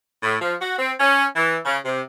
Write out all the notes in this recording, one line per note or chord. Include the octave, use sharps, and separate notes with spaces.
A2
F3
F#4
C4
C#4
E3
C#3
C3